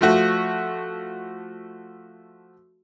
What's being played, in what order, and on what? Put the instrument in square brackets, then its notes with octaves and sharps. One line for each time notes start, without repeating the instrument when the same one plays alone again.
[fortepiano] F3 A3 F#4